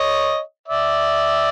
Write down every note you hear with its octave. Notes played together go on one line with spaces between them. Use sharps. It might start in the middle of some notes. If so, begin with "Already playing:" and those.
Already playing: C#5 D#5
D5 E5